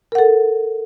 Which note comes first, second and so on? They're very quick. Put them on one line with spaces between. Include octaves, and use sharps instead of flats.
A#4 F#5 A4